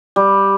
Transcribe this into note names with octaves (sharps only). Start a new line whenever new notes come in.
G3